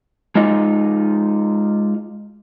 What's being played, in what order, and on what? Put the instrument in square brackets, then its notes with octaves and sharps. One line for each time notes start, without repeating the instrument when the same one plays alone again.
[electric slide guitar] G#3 D#4 F4 D#5